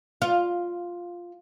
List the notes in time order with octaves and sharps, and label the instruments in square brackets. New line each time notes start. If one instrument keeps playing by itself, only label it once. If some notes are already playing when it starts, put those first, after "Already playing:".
[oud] F4